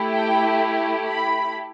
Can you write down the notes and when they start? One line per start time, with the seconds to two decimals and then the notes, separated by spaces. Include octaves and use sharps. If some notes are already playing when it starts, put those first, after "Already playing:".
Already playing: A3 E4 G4
0.14 G5
1.08 B5